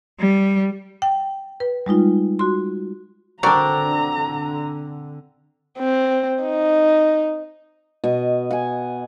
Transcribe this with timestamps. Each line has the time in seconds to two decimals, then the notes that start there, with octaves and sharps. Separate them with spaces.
0.20 G3
1.02 G5
1.60 B4
1.86 G3 G#3 D#4 F4
2.39 F#4 C6
3.43 D3 C4 D4 F#4 A#4 D5 A#5
5.79 C4
6.43 D#4
8.04 B2 D#5 C#6
8.51 F#5 G#5